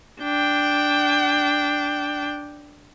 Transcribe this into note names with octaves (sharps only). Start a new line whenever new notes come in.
D4 G5